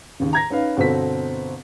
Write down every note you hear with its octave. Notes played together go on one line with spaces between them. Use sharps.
D#2 C#3
A#5 G#6 A#6
C#4 D#4 B4 F5
G1 B2 C4 A4 B6